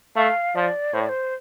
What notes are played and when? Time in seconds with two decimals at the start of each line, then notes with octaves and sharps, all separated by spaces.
0.16 A3 F5
0.55 F3 D5
0.93 A2 C5
1.01 D5
1.09 C5